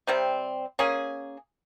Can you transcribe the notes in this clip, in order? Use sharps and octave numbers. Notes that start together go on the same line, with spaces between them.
C3 G3 C4
A#3 C#4 G#4